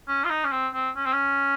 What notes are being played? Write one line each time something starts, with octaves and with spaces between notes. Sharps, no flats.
C#4
F4
D#4
C#4
C4
C4
C#4
C4
C#4